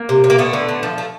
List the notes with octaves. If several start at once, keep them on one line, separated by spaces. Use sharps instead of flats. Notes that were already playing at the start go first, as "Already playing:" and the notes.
Already playing: A#3
C3
C3
A#3
D3 A3 B3
D3
D3
F3
A3